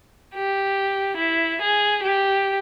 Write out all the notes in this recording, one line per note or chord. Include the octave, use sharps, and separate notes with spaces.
G4
E4
G#4
G4